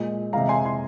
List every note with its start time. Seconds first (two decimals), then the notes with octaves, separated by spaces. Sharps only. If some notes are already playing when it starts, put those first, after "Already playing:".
Already playing: A#2 G#3
0.33 C3 G#3 F5 A#5
0.49 G#5 C6
0.65 G#5 C6